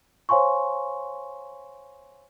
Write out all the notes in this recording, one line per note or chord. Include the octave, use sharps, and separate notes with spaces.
C5 C#5 F5 G#5 C6 C#6